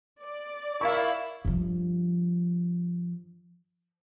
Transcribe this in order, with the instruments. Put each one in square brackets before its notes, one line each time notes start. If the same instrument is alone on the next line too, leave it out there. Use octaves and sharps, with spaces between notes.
[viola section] D5
[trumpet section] E4 [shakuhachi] A#4 [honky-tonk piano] F5 C#6
[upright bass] G2 F3